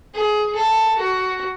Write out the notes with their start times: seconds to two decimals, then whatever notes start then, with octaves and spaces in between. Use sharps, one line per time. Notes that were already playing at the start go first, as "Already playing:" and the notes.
0.14 G#4
0.55 A4
0.97 F#4